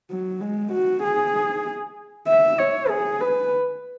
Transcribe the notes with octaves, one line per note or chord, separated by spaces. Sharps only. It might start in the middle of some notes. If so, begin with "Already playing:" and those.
F#3
G#3
F#4
G#4
E5
C#5
G#4
B4